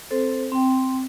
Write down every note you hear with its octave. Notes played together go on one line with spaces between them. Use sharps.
C4 A4 C5
C4 G5